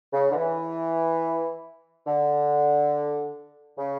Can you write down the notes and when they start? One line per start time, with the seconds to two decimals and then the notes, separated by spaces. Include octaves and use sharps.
0.12 C#3
0.30 D3
0.34 E3
2.06 D3
3.76 C#3